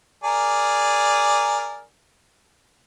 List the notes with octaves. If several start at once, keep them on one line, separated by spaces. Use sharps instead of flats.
G#4 A#4 D5